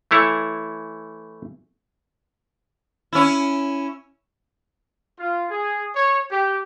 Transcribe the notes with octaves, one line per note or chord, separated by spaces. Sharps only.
E3 A3 E4 C#5
C#4 E4
F4
G#4
C#5
G4